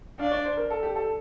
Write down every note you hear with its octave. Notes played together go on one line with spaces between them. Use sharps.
D4 F5
D5
C5
A#4
A4
G4
A4